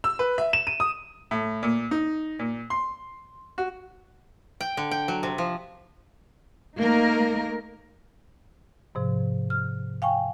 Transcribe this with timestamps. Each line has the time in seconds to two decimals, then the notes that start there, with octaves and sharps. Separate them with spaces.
0.04 E6
0.19 B4
0.38 E5
0.53 E7
0.67 D#7
0.80 D#6
1.31 A2
1.63 A#2
1.91 D#4
2.39 A#2
2.70 C6
3.58 F#4
4.61 G5
4.77 D3
4.91 G5
5.08 F#3
5.23 C3
5.38 F3
6.78 A3 A#3 D#4 A#4
8.95 G#2 C3 F3
9.50 F6
10.02 F5 G5 G#5 C#6